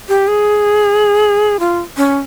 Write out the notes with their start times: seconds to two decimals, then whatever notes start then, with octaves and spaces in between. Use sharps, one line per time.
0.08 G4
0.27 G#4
1.59 F4
1.97 C#4